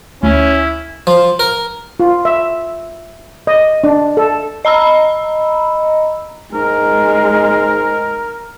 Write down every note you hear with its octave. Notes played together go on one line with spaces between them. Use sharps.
D2 C#4 E4
F3
A#4
F4
E5
D#5
D4
A4
D#5 A#5 B5 E6
G#2 G#3 A#4